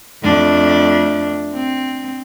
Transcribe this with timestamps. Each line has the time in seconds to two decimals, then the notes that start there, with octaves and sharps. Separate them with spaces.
0.23 F2 A3 D4
1.53 C4